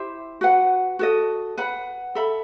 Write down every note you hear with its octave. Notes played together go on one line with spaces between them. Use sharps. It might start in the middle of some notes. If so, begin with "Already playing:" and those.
Already playing: E4 G4 C5 E5
F#4 B4 F#5
F#4 A4 D#5
B4 F#5 B5
A4 E5 B5